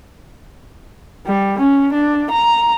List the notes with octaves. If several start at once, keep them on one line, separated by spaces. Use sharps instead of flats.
G3
C#4
D4
A#5